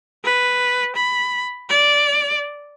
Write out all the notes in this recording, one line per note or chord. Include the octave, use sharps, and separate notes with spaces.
B4
B5
D5